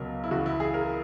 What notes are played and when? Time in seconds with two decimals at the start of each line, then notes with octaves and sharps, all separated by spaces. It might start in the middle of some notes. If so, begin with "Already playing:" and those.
Already playing: C#2 B2 F#3 A#4
0.24 E4
0.31 C#2 C#3 E3 F#4
0.46 E4
0.60 G#4
0.74 A#4